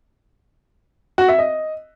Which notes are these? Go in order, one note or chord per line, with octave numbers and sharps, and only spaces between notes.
F#4
E5
D#5